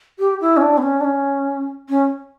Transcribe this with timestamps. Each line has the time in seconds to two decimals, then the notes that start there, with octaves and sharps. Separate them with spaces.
0.19 G4
0.41 E4
0.57 C#4
0.62 D4
0.78 B3
0.82 C#4
1.00 D4
1.04 C#4
1.89 C#4